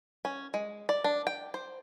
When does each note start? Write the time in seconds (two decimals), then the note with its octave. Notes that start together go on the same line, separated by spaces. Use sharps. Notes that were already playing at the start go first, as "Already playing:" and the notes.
0.25 C#4
0.54 G#3
0.89 D5
1.04 D4
1.27 G5
1.54 C5